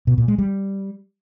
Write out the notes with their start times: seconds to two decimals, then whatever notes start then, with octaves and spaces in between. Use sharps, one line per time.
0.07 B2
0.18 A#2
0.28 G#3
0.38 G3